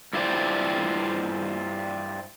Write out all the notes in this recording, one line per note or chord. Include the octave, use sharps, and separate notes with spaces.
G2 E4 F4 G4 C5 D5